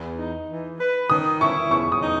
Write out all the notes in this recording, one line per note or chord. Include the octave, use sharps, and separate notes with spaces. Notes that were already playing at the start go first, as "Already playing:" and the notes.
Already playing: E2
D#4
E3
B4
D#3 D#6
E4 C#6
E2 C#6
D#6
D#4